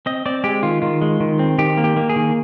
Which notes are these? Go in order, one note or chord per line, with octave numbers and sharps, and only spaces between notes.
C4 D#5
C4 D5
G#3 G4
D#3 F4
D#3 F4
G#3
D#3
C4
D#3 G4
A#3
G4
A#3
G#4
D#3